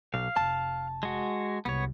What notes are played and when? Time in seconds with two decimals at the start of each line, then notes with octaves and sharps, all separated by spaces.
0.14 B1 F5
0.37 F1 A5
1.03 G#3 F#4
1.65 F#1 C2 B3 C#5